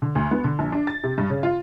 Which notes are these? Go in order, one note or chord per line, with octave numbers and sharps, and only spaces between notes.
D3
D2
B3
D3
A#1
D4
A6
C3
G2
C#3
F4